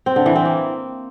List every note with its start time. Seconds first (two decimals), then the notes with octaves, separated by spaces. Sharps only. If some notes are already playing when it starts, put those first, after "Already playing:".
0.06 C4
0.16 D3
0.26 E3
0.36 C4
0.45 A#3